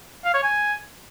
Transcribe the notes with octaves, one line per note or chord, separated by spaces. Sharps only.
F5
C#5
G#5